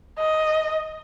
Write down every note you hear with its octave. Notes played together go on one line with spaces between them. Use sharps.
D#5